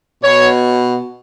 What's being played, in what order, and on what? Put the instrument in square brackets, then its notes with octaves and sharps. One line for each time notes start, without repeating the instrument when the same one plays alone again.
[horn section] B2 C#5